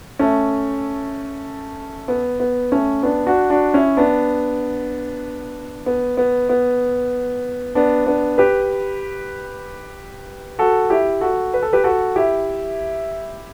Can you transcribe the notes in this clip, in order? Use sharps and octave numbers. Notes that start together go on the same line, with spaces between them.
A3 C#4
B3
B3
A3 C#4
B3 D4
D4 F#4
D4 F#4
C#4 E4
B3 D4
B3
B3
B3
B3 D4
B3 D4
G4 B4
F#4 A4
E4 G4
F#4 A4
B4
A4
G4 B4
F#4 A4
E4 G4